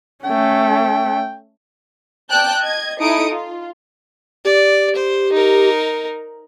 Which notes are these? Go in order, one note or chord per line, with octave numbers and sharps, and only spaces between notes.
A3 C#4 G5
D5 G5 A5 F#6 G6
D#5 G#6
D#4 E4 A4 D#6 C#7 D7
F4
G4 D5
C5
D#4 A#4